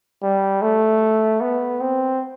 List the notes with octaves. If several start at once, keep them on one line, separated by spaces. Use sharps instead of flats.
G3
A3
B3
C4